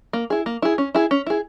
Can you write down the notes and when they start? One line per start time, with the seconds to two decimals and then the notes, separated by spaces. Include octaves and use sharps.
0.13 A#3
0.30 E4 G#4
0.46 A#3
0.62 E4 G#4
0.78 C#4
0.95 E4 G#4
1.11 C#4
1.27 E4 G#4